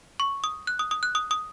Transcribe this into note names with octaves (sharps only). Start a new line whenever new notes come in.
C#6
D#6
F#6
D#6
D#6
F#6
D#6
D#6